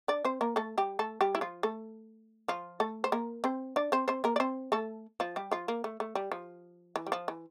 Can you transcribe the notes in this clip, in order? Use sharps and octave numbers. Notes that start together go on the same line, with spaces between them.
D4 D5
C4 C5
A#3 A#4
A3 A4
G3 G4
A3 A4
G3 G4
E4
F3 F4
A3 A4
F3 F4
A3 A4
C5
A#3 A#4
C4 C5
D4 D5
C4 C5
C4 C5
A#3 A#4
D5
C4 C5
A3 A4
F3 F4
G3 G4
F3 F4
A#3
A3
A3
G3
F3
E3
G3
F3
E3